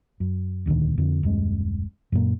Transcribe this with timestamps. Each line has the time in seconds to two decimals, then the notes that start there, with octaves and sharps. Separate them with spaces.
0.20 F#2
0.66 E1 D2 A#2 D#3
0.98 F2 D3
1.23 D#1 F#2 G#3
2.12 F#2 A#2 A#3